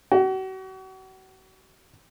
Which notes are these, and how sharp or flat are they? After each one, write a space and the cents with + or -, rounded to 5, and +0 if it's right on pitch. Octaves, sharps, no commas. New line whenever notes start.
F#4 +40